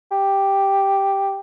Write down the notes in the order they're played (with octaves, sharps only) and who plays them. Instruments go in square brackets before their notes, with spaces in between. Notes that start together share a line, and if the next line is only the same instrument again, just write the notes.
[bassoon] G4